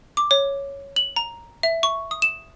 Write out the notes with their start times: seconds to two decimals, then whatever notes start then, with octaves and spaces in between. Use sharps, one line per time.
0.17 D6
0.31 C#5
0.96 F#7
1.16 A#5
1.63 E5
1.83 C#6
2.11 D#6
2.22 E7